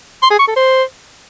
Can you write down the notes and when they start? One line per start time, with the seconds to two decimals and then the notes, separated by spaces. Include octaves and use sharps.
0.22 C6
0.31 G#4
0.39 C#6
0.48 A4
0.56 C5